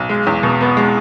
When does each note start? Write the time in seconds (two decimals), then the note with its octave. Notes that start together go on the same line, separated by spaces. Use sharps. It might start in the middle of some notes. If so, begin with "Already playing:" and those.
Already playing: B1
0.09 G#3
0.27 E2
0.43 B2
0.61 B3
0.77 G#3